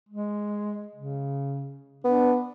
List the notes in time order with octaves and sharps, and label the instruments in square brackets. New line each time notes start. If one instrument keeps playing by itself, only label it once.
[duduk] G#3
C#3
[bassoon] B3 [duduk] D4